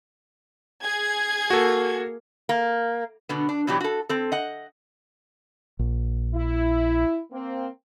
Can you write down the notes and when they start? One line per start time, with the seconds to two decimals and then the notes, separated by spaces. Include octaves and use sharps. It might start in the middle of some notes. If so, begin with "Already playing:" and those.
0.84 G#4 G#6
1.50 A#3 F#4 A4
2.49 A#3
3.29 B2 D3 B3
3.49 D4
3.67 B2 E3 F#3 B3 D4 G4
3.81 F#4 A4
4.09 C4 A4
4.32 D#5 F#5
5.79 A#1
6.35 E4
7.32 A#3 C4